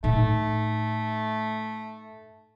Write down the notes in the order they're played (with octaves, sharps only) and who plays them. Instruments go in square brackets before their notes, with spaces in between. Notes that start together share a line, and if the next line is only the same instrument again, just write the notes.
[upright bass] A2 D#4 [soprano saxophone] A3